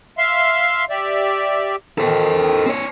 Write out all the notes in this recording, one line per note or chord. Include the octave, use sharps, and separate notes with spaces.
E5 F5 C6
G4 D5 E5
D#3 A4 C5
C4 C#5